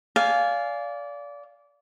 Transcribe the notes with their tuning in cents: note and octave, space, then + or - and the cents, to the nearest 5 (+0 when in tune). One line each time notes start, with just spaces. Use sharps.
D5 -25 F5 +0 G#5 +0